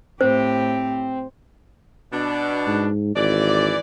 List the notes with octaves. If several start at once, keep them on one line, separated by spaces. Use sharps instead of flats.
A2 C4 G4 C5
B2 D4
G#2
G#1 E3 D5